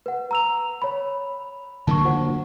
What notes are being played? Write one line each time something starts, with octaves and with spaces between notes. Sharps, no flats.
B4 F#5
A#5 E6 F7
C#5 B5
D3 F#3 A#3 A5 C#6
F4 C5 F#5